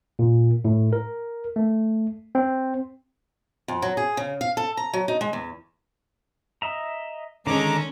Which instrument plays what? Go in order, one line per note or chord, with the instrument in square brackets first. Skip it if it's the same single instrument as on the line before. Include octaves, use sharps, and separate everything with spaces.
[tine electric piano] A#2
A2
A#4
A3
C4
[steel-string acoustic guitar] F2
F#3
G#4
C#3
F5
A4
A#5
F#3
D#4
G#3
E2
[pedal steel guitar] D#5 E5 A#5
[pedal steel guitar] D3 D#3 A4 [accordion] G#3 A#5 D6 [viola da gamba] C#4